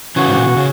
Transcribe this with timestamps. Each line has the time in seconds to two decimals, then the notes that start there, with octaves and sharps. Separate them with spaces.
0.16 C#3 E3 F#4
0.27 G#2
0.37 A#2
0.47 B2
0.57 C#3